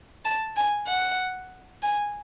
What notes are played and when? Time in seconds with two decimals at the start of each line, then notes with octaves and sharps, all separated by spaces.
0.25 A5
0.57 G#5
0.87 F#5
1.82 G#5